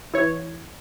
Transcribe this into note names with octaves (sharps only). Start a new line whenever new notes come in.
E3 C#5